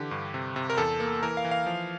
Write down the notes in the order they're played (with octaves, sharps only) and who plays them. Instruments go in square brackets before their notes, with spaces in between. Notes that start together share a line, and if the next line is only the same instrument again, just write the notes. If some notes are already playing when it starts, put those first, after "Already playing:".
Already playing: [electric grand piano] D3 E3 G4
G2
C3
C3
A#4
E2 A4
A#3
E3 A#4
F5
E3
F5
F3